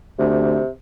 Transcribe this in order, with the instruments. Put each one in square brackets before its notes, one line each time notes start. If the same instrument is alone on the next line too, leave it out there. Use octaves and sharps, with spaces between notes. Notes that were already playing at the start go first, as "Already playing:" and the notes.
[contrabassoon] D2 [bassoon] C3